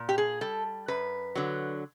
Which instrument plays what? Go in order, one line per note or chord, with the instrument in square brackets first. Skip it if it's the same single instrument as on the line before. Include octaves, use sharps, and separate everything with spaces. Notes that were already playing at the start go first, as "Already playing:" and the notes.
Already playing: [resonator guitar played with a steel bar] A#2
G4
G#4
G3 A4
F#2 B4
D3 F#3